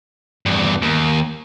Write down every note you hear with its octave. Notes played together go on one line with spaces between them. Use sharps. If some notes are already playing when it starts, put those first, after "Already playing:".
E2 G2
D#2